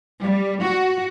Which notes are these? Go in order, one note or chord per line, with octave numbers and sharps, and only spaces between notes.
G3
F#4